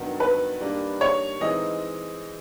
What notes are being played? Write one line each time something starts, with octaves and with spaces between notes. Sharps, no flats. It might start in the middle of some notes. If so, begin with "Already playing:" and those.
Already playing: G2 D#3 F#3 B3
B4
D#3 G3 A#3 D4
C#5
E3 G#3 C4 D#4 D#5